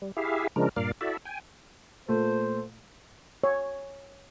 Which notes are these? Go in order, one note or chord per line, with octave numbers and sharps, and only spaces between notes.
G3
E4 G4 G#4 E5 F5
C#3 F3 G#3 D4 A#4
G2 A#2 A#4 D5 F5
E4 F#4 A4 D5 E5
G5 G#5
A#2 A3 C5
C#5